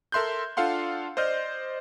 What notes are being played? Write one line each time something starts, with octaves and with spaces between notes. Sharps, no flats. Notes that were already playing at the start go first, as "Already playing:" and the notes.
A4 A#4 E5 C6 F#6 G6
D4 F4 A4 F5 F#5 C6
C5 D5 D#5 F6 G6